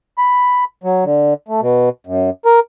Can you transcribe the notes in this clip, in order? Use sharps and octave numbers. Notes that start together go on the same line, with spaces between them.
B5
F#3
D3
A3
B2
F#2
A#4